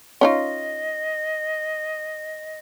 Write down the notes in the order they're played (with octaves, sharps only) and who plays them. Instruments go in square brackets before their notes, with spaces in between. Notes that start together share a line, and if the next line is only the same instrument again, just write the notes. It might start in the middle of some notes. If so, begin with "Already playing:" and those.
[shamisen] C#4 D#4 F4 [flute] D#5